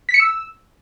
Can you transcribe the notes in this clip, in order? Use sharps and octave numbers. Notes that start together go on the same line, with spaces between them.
B6
C#7
E6